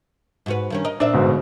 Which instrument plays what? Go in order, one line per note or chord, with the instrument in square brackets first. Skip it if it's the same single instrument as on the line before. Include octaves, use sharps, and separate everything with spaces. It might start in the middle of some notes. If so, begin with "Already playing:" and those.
[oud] G#2 F#4 B4
G2 D#3 C#4
A#4 D#5
[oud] A#2 C4 E5 [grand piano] D4
[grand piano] G1 G#2 B2